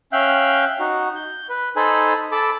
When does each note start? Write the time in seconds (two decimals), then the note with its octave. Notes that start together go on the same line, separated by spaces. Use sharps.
0.13 C#4 E5 F5 G5 F#6 G6
0.80 D#4 F#4
1.15 G6
1.49 B4
1.76 D#4 A4 C5 G#5 B5
2.32 A4 A5 B5 D6